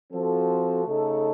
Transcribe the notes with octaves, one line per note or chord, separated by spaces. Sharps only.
F3 C4 F#4 A4 C5
C#3 A3 D#4 A4